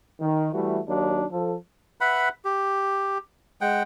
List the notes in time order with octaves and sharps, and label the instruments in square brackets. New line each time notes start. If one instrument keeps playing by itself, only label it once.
[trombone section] D#3
E3 G3 A3 F#4
D#2 F#3 D4 D#4
F3 A4
[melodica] B4 E5 F#5 B5
G4
G#3 F#5 G5